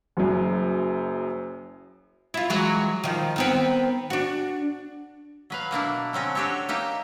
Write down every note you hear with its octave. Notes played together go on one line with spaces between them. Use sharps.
F#1 F#2
E4 F4
E3 F#3 G#3
D#3 F3
D#3 B3 C4
D4 F#4
F#3 B4 F5
B2 A#3 D4 E4
D3 F#3 C4 C#4
D4 F#4 G4 A4 C#5
A#3 D#4 G4 E5